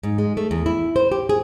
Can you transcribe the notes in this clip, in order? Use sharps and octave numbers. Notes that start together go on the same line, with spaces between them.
G#2
G#3
A3
E2
E4
C5
G4
G#4